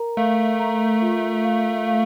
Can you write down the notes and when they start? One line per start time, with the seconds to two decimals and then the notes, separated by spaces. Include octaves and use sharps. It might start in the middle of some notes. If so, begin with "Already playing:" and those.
Already playing: A#4 A#5
0.17 A3 F5
0.59 A#5
1.02 F4
1.45 F5
1.87 F5